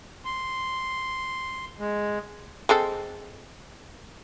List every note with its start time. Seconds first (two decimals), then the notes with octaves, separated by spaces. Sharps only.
0.25 C6
1.79 G#3
2.69 G#3 C4 A4